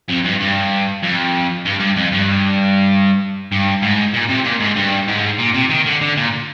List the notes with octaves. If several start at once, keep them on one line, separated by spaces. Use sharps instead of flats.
F2
G2
G2
F2
G2
G2
F2
G2
G2
G#2
A#2
C3
A#2
G#2
G2
G#2
A#2
C3
D#3
D3
D3
A#2